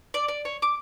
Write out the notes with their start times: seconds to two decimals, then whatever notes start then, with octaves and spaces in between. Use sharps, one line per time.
0.14 D5
0.28 D5
0.45 C#5
0.62 D6